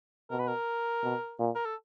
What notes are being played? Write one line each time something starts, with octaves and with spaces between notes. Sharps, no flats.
B2 A#4
B4
A#4
B2
A#2
A#4
A4